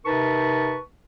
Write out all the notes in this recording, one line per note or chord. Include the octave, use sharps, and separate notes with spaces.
C3 D#4 A#4 B4 A5 C#6